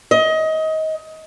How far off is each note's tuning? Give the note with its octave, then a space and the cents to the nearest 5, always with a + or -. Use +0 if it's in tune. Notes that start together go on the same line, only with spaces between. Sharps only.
D#5 +25